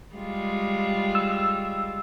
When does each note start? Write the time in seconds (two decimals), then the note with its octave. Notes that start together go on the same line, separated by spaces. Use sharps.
0.15 G3 G#3 F4
1.15 E6